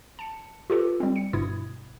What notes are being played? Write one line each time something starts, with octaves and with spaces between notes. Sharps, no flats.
A5 C#7
F4 G4 A4 B4
G3 C4
C#7
G1 G2 B2 E4 D#6 G#6